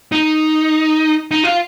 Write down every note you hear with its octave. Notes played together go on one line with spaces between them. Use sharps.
D#4
D#4
F4